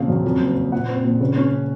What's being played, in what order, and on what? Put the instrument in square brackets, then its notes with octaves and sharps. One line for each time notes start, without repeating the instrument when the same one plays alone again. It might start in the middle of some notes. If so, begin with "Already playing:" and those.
Already playing: [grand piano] A#1 C#3 C4 F5
F#2
F2
F#1
F#1
A#2 F#5
C4
A#1
C#3
C#4